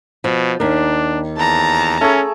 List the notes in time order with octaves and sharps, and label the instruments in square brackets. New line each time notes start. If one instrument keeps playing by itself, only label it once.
[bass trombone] B2 [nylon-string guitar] F3
[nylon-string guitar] D#2 A#4 [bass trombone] D4
[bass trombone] E2 [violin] A5 A#5
[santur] A3 G#4 [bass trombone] C#4